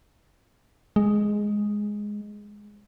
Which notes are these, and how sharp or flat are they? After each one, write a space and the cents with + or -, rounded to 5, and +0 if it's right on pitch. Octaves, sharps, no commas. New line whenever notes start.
G#3 +0